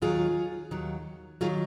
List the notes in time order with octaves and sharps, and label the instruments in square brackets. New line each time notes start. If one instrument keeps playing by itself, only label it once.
[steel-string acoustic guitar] D#2 D#3 F#3 F4 G#4
D#2 D#3 F#3
D#3 F#3 F4 G#4